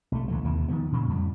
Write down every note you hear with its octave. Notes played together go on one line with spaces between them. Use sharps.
B1 A3
C#2 E3 A3
D#2 C3 E3
D#3 F3 B3
A#2 C#3 E3
F2 A2 G3